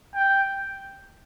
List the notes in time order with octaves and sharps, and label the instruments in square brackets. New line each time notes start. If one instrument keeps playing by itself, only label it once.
[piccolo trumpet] G5